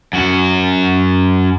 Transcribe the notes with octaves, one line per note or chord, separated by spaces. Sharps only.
F#2 F#4